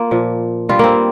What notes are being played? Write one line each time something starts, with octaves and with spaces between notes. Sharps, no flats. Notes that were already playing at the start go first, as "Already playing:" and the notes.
Already playing: A#3 F4
A#2 F3
G2 G3 F4
A#3 C4